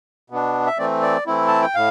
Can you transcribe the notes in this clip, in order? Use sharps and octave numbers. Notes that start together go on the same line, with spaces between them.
B2 B3 D4
E5
E3 A3 C4 D5
D5
E3 A3 C4 E4
A5
G5
A2 F5